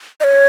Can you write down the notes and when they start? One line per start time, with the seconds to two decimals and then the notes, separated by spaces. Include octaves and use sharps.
0.20 D#5
0.24 C#5